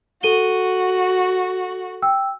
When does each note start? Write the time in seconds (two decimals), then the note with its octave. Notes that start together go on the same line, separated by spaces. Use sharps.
0.23 F#4 A4 D#7 G7
2.02 G5 E6